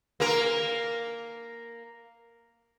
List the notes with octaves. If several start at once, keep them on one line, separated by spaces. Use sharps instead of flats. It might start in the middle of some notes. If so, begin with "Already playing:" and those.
A#3 A#4